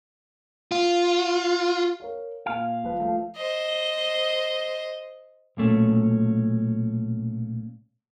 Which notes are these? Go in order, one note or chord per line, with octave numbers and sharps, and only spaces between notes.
F4
A#4 C#5 F5
A#2 F5 G#5
D#1 F3 B4
F3 A3
C5 D#5
B1 A#2 A3 C#4